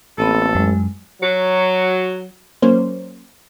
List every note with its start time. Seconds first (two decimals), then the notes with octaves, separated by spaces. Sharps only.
0.18 A1 A#3 C4 A4 B5
0.55 F#2 G#3
1.21 F#3
2.62 F#3 A#3 C#4 C5